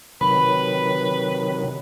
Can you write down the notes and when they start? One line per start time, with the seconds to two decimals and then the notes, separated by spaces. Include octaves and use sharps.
0.21 C3 D#3 F#3 B4 B5